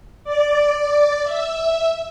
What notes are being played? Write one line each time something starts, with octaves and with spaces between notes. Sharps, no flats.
D5
E5